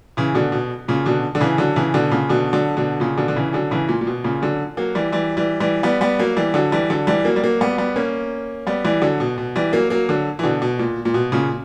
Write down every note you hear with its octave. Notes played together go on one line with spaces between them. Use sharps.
C#3 E3
B2 D3
B2
A#2 C#3
B2 D3
D3
C#3 E3
D3 F#3
C#3 E3
B2 D3
A#2 C#3
B2 D3
D3 F#3
B2 D3
A#2 C#3
B2 D3
D3
C#3 E3
D3 F#3
C#3 E3
A#2
A#2
B2
A#2 C#3
D3 F#3
F#3 A#3
E3 G3
E3 G3
E3 G3
E3 G3
G3 B3
G3 B3
F#3 A#3
E3 G3
D3 F#3
E3 G3
D3 F#3
E3 G3
F#3 A#3
G3
F#3 A#3
G3 B3
G3 B3
A#3 C#4
G3 B3
E3 G3
D3 F#3
B2
B2
E3 G3
F#3 A#3
F#3 A#3
D3 F#3
E3
B2 D3
B2
A#2
A#2
B2
A#2 C#3